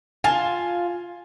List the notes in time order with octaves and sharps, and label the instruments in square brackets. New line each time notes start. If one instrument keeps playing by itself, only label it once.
[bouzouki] F4 A5 [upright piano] G#5